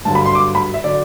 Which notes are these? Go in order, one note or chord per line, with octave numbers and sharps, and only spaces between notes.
G2 D3 F#3 A5
B5
C6
D6
B5
E5
D3 F#3 D5